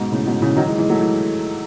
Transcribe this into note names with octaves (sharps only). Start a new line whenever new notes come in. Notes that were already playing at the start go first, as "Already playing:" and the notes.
Already playing: G#2 B2
A2 C#3
G#2 B2
C#3 E3
D#3 F#3
E3 G#3
E3 G#3
F#3 A3
E3 G#3